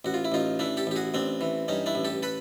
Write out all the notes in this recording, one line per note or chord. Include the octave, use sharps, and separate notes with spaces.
A1 F#4
F4
E4
A1 D#4 F4
E3 D4 E4
G4 A4
A1 G4
F#4 G#4
A1 C4 D4
E3
G2 C#4 D#4
D4 E4
A1
G4 A4
A4 B4